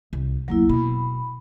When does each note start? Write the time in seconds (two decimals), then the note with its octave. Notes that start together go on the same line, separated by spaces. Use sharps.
0.13 C2
0.48 F#1 D2 F#3 A#3 E4
0.69 B2 B5